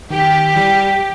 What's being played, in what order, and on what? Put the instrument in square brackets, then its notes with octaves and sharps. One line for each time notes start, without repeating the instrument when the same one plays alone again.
[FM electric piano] D#3 [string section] G4
[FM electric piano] E3 [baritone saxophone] G3